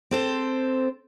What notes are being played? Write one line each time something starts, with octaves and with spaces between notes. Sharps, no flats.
C4 A4 C5